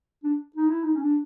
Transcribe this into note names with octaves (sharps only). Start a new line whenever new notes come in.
D4
D#4
E4
D#4
C#4
D4